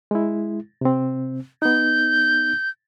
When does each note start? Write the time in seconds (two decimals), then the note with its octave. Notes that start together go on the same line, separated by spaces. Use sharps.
0.11 G#3 E4
0.81 C3 C4
1.62 B3 D#4 G6